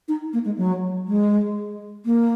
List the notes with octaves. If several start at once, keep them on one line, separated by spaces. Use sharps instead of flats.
D#4
A#3
G#3
F#3
G#3
A#3